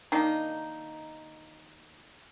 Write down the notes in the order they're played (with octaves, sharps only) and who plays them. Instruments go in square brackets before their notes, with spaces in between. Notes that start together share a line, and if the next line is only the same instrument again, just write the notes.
[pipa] D#3 A#3 D4 D#4